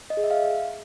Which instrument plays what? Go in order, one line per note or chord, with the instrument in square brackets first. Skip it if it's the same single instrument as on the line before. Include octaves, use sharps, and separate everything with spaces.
[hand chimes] D#5
G#4
E5
F5